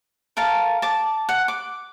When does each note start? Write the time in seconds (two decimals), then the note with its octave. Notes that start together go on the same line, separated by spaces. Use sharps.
0.37 A4 A#4 F5 A5
0.82 A5 D6
1.29 F#5
1.48 D6